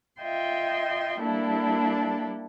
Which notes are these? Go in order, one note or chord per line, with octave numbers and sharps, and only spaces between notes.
F4 D#5 E5 G5 C6
G3 A#3 D4 E4 A4